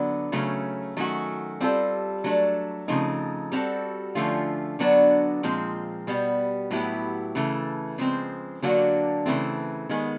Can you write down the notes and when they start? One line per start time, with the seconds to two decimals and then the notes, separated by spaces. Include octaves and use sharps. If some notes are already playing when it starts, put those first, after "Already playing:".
Already playing: D3 F#3 B3
0.32 C#3 F#3 A3 C#4
0.97 D#3 F#3 A3 C#4 F#4
1.60 G3 C4 F4 A4
2.24 F#3 A3 D4
2.88 C#3 F3 A3 C4 D#4
3.52 G3 C4 D#4 F#4 A4
4.15 D3 F3 A3 C#4 F4
4.79 D3 F#3 B3 D4 F#4
5.43 A#2 F3 G#3 C4
6.07 B2 G3 B3
6.71 A2 F#3 B3 E4 G4
7.35 C#3 E3 A3
7.98 C#3 F3 G#3 C4
8.62 D3 F#3 A#3 D4 F#4
9.26 C#3 E3 A3 C4
9.89 D#3 G#3 B3